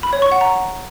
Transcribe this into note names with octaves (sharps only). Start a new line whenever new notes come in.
B5
C#5
C#6
F#5
A#5